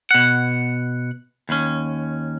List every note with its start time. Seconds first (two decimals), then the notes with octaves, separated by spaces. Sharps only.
0.11 B2 F#5
1.49 D#2 C#4